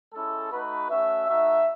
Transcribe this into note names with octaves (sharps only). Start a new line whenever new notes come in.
G#3 C#4 E4 A4
A3 D#4 F#4 B4
A3 C#4 F#4 E5
A3 D#4 F#4 E5